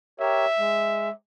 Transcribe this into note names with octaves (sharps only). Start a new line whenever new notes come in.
G4 A#4 C#5 E5
G#3